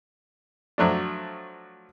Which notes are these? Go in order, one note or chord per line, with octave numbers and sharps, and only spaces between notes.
F3 F#3 A3 D4